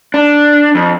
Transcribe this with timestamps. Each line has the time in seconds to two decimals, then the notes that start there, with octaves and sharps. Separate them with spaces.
0.14 D4
0.75 F2